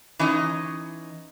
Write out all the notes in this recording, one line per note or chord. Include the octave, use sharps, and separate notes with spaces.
E3 C#4 D#4 D#5